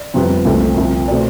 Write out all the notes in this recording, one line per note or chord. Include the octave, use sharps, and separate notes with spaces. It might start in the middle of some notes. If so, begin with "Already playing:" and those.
Already playing: D5
F2 C3 G3 B3
C2 C3 F3 A3
C2 C3 F3
B2 A3 C4 D5